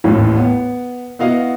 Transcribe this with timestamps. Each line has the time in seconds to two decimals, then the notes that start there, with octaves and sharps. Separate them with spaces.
0.04 A1 D#2 A2 E3
0.36 B3
1.19 B3 E4 F#4 D#5 F5 F#5